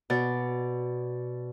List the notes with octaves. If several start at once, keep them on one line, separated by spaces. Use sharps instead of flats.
B2 D5